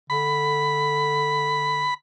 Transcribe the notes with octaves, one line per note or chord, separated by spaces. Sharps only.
D3 B5